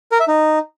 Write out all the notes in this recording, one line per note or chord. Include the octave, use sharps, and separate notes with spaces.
A#4
E5
D#4